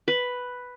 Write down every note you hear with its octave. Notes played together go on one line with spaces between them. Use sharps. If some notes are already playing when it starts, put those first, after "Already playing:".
B4